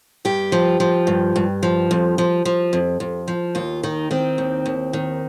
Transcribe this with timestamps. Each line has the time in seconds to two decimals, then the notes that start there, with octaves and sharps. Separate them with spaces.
0.25 G2 G4
0.52 F3
0.80 F3
1.07 G2
1.36 G2
1.63 F3
1.91 F2
2.18 F3
2.45 F3
2.73 F2
3.00 F2
3.28 F3
3.55 D#2 F4
3.83 D#3 D#4
4.11 D#3 C4
4.38 D#2
4.66 D#2
4.93 D#3